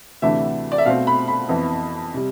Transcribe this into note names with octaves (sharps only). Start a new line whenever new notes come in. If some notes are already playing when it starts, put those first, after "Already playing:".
D2 C3 E3 A3 D4 E5
D5
E5
B2 A3 C4 F5
B5
B5
F2 E3 B3
C3 G3